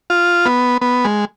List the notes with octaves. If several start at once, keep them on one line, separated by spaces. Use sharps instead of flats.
F4
B3
B3
G#3